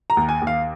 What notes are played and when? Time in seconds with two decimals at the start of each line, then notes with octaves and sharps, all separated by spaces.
0.10 A#5
0.17 D#2
0.29 G#5
0.42 D#2
0.47 F5